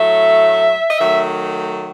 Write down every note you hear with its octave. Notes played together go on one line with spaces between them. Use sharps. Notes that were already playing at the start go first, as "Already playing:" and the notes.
Already playing: A2 F#3 A3 E5
D#5
D#3 F#3 A3 E5